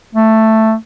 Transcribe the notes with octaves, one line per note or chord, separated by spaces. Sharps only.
A3